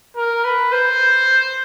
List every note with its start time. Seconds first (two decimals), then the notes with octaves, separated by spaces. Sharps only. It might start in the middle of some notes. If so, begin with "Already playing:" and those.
0.16 A#4
0.44 B4
0.72 C5